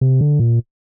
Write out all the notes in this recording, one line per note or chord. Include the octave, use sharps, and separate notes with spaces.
C3
D3
A#2